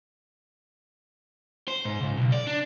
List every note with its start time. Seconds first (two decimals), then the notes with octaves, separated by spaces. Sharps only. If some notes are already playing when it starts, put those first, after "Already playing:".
1.68 C5
1.85 G#2
2.01 C#2
2.17 B1
2.32 D5
2.47 D4